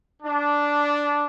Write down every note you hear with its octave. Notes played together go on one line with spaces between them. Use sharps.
D4